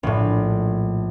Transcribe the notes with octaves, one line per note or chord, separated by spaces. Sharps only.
A#1 A2